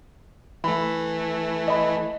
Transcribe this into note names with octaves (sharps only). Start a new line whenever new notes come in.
E3 A3 B5
D#5 B5